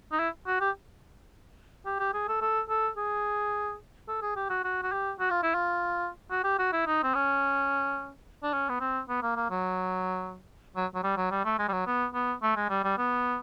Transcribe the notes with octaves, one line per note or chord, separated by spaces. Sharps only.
D#4
E4
F#4
G4
G4
G4
G#4
A4
A4
A4
G#4
A4
G#4
G4
F#4
F#4
F#4
G4
F#4
F4
E4
F4
F#4
G4
F#4
E4
D#4
C4
C#4
D4
C#4
B3
C4
B3
A#3
A#3
F#3
F#3
F#3
G3
F#3
G3
A3
G#3
G3
F#3
B3
B3
A3
G#3
G3
G3
B3